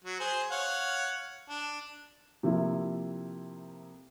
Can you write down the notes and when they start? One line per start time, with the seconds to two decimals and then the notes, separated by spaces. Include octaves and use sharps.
0.05 F#3
0.20 G#4 C5
0.51 C#5 F5 F#5
1.50 D4
2.43 C3 F3 A3 A#3 E4 F4